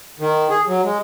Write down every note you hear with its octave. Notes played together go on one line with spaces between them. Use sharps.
D#3
G#4
F#3
G#3